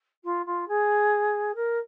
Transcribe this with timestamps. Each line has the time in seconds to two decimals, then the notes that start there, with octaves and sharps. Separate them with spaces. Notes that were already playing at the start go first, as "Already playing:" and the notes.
0.24 F4
0.45 F4
0.68 G#4
1.55 A#4